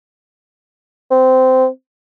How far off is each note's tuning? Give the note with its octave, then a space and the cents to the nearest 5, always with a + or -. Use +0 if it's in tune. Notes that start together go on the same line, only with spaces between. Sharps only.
C4 -15